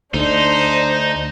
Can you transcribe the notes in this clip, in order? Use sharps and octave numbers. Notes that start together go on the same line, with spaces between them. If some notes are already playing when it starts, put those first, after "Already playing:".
D2 D4 D#4 C5